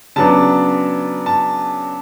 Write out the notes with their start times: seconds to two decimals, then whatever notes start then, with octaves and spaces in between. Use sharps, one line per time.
0.16 C#3 F#3 B3 D4 A5
1.26 A5